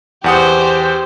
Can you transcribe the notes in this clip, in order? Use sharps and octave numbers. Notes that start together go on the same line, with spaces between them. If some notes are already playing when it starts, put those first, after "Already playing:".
E2 G4 C5 F#5 D#6